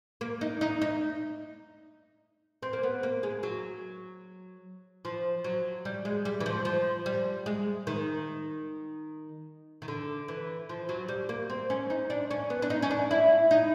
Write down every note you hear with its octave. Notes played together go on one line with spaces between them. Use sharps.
A#3
D#4
D#4
D#4
C4
A#3
B3
A#3
G#3
F#3
F3
F#3
G3
G#3
G3
E3
F3
F3
G3
G#3
D#3
D#3
D3
E3
F3
F#3
G3
A#3
C4
C#4
D#4
D4
C#4
B3
D4
D#4
C#4
D4
E4
D#4